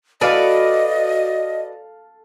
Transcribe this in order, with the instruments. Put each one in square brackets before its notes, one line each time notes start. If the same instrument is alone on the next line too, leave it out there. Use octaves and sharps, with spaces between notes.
[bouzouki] F#4 B4 D5 [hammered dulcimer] A4 F5 [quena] D#5